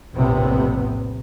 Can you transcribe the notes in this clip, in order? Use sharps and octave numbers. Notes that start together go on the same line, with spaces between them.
F1 A#1 A2 C3 B3